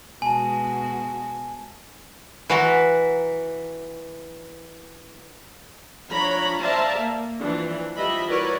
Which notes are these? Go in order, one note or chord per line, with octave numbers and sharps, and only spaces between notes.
B2 G#3 F#4 G#5 A5
E3 F#4 B4 A#5 C6
F3 D4 C#5 A#5 B5
C5 D5 E5 F5 A5 A#5
A#3
E3 F3 D4
E3 F3 G3 D#5 E5 B5
E4 F#4 A#4 B4 C#5 D5